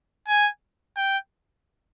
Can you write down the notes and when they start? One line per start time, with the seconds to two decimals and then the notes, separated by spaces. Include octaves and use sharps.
0.28 G#5
0.97 G5